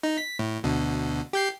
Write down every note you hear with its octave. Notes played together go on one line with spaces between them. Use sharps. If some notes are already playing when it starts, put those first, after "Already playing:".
D#4
B6
A2
D2 B2 D3
G4 G6 C7